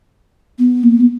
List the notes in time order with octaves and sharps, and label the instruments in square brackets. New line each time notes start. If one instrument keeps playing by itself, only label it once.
[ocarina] B3
A#3
B3